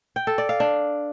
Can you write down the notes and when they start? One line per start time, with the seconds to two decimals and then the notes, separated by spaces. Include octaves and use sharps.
0.16 G5
0.27 A4
0.38 D5
0.49 F5
0.60 D4